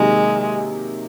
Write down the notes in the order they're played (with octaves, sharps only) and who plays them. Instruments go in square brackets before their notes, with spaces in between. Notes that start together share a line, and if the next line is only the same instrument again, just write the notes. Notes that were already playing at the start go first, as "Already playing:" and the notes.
Already playing: [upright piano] C3 D#3 F#3 A#3 [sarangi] G#3